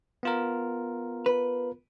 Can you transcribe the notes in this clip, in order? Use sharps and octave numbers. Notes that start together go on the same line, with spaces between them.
B3 F4 A#4
B4